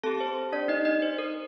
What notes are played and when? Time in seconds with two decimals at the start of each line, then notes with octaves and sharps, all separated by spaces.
0.03 C4 G4 A4 A5
0.20 C5
0.52 D4 D5
0.68 D#4 D#5
0.85 D#4 D#5
1.02 C5
1.18 A#4